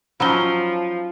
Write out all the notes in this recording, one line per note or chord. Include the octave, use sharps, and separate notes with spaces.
F3 F#3 C#4 D#4 B5 G7